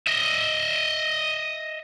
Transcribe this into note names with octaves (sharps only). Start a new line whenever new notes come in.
D#5 E5